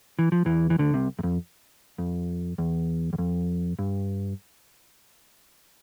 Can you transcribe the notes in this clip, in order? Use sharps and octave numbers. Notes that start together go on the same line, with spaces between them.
E3
F3
E2 E3
E3
D2 D3
C2 C3
E2
F2
F2
E2
E2
F2
G2